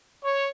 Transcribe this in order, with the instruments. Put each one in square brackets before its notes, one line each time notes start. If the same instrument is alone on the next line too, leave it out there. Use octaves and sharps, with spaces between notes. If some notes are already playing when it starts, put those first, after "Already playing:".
[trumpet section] C#5